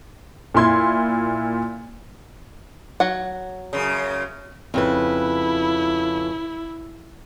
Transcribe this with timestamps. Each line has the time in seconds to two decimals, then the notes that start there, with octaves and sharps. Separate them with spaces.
0.54 A#2 E4 C6 G#6
3.00 F#3 F#5
3.73 F#2 C#3
4.74 F2 C#3 E4 B4